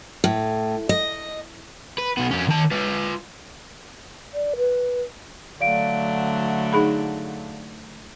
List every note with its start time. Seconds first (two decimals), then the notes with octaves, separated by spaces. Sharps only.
0.24 A2
0.89 D#5
1.98 B4
2.17 B1 B3
2.31 F2 C#4
2.48 D#3 A5
2.72 F4 B4
4.34 D5
4.57 B4
5.60 D3 F#3 A3 D5 F5 D7
6.73 D#4 G#4 B5